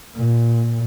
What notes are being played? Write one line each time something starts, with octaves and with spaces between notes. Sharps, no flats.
A#2